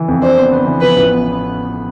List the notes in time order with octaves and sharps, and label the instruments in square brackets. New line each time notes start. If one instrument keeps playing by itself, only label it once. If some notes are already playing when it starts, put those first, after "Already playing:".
Already playing: [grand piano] E3
F2
[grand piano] D4 [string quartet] C5
[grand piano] B3
B3
E3
[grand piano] F3 [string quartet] B4
[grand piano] A1
B3